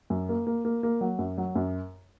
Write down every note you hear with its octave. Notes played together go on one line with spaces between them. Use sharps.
F#2
A#3
A#3
A#3
A#3
F#3
F#2
F#3
F#2